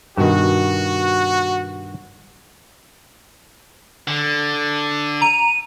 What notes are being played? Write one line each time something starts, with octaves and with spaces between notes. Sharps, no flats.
G2 B2 D#3 F#4
D3
A#5 D#7